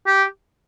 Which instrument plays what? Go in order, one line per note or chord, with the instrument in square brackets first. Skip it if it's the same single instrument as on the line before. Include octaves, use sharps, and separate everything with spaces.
[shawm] G4